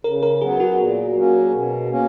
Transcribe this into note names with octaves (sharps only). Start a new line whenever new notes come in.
C#3 A#4
A#4
F#3 B3 G#4
F#4
A#2
F#3 A#3 C#4
B2
A#3 C#4